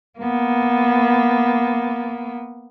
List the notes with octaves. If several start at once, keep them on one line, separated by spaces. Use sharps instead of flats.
A#3 B3